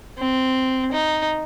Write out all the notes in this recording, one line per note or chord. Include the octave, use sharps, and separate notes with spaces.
C4
D#4